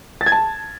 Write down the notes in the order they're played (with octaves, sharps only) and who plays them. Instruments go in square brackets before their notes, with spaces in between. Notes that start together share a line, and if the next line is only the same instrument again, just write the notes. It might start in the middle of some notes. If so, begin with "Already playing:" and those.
[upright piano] A6
G#6
A5